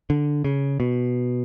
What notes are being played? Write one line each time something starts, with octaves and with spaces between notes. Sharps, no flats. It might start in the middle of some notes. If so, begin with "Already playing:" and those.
D3
C#3
B2